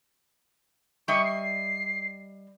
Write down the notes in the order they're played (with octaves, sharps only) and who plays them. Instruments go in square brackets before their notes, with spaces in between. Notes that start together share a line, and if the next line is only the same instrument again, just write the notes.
[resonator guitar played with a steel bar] G3 D#5 E5 [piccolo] C#6
[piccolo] C7